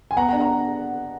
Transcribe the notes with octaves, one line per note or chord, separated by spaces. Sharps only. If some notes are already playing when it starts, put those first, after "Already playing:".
G#5
B3 F#5 A#5
F#5 A#5
D4
F#5 A#5